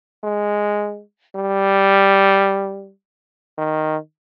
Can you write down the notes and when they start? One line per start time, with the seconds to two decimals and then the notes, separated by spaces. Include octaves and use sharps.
0.24 G#3
1.35 G3
3.58 D#3